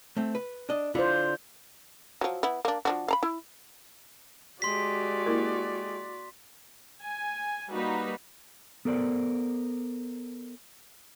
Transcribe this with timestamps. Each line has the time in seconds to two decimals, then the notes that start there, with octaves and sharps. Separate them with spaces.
0.17 A3 C4
0.35 B4
0.69 D4 D#5
0.95 D3 E4 F4 C5
2.21 F3 F#3
2.43 B3 E4
2.65 A#3 D4
2.85 F3 D4 F#4
3.08 F5 A#5 B5
3.23 E4
4.62 G#3 F#4 G4 D5 C6 B6
5.26 A#3 E4 A#4
7.01 G#5
7.70 G3 A#3 D#4 F#4 B4
8.85 B3 A4 A#4 C5 D5